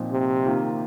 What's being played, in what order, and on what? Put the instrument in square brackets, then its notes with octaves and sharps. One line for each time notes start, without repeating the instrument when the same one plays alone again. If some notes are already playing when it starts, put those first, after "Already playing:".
Already playing: [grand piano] A#2 F3 C4 D#4
[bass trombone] C3
[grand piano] D#3 A#3 F4